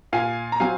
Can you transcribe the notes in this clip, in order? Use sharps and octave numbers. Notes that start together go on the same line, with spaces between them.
A#2 F5 G#5
A#5
F#3 C4 F5 G#5